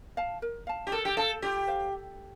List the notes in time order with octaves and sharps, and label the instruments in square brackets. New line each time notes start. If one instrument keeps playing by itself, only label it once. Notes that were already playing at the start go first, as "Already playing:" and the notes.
[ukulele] F5 A5
A#4
F5 A5
[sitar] G4
[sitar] A4 [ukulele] A#4
[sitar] G4
[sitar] A4 [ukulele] F5 A5
[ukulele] F4 [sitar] G4
[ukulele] C5 F5